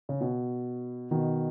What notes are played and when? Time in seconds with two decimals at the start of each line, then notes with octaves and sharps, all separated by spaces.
0.09 C#3
0.21 B2
1.11 B2 D#3